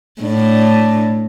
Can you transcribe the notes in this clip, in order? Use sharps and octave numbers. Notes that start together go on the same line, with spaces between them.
A2 D4